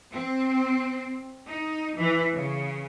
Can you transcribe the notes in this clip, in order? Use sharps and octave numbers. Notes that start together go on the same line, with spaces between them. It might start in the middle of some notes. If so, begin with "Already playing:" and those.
C4
D#4
E3
C#3